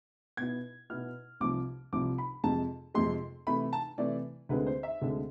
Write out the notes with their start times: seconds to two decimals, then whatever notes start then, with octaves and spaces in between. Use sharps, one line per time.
0.37 B2 B3 E4 G#6
0.90 B2 B3 E4 F6
1.40 C2 C3 F3 D6
1.93 C2 C3 F3 D6
2.18 B5
2.44 F2 C3 G#3 A5
2.95 F2 C3 G#3 C6
3.47 C3 E3 A3 B5
3.73 A5
3.98 C3 E3 A3 D5
4.49 D2 D3 G#3 C4 B4
4.67 C5
4.83 E5
5.01 D2 D3 G#3 C4